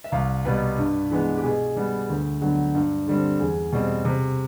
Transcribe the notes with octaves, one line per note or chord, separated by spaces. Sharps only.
E5
C2 F5
B2 G3 B4
G2
E3 G#3 B3
G4
B2 G#4
G3 B3
D2
D3 F#3 B3
G2
D3 G3 C4
E2 G#4
B2 G3 C4
C3